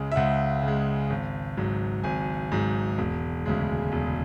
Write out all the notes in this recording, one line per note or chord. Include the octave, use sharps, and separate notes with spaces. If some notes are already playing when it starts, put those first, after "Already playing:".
Already playing: C#2 C#3 G#3
E5
C#2 F#5
C#3
G#3
G#1
G#2 F#3
G#1 G#5
G#2 F#3
E1
D2 C#3 G#3
E1